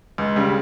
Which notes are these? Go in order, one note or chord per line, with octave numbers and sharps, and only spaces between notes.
C#2
C#3 G3